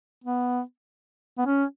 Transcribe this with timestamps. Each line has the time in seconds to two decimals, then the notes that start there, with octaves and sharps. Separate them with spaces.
0.24 B3
1.38 B3
1.46 C#4